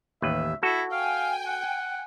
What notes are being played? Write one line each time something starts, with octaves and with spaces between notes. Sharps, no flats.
A1 D#2 B4 E5
E4 F#4 A4
F5 G5 G#5
F#5